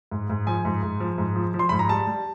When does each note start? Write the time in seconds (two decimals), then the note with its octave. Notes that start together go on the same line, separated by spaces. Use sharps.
0.11 G#2
0.30 G#2
0.47 F3 G#5
0.65 G#2
0.83 G#2
1.00 F3
1.18 G#2
1.36 F3
1.54 F3
1.59 C6
1.69 G#2 B5
1.79 A#5
1.89 G3 A5
2.07 G3